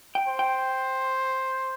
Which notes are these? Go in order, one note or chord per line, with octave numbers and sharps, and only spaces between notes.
G5
C5
G5